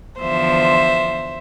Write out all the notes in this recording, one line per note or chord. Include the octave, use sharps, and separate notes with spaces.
E2 D3 F3 C5 E5